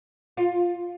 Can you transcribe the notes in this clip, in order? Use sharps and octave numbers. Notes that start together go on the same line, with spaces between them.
F4